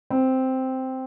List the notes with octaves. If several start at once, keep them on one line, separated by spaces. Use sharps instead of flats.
C4